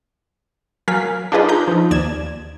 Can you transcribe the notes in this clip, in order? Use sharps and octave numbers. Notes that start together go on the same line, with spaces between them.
F#3 A#4 F5 G#5 B6
D4 D#4 F4 G#4 B4 D#5
A#5 G6
F3 D#4
D#2 D5 G#6 E7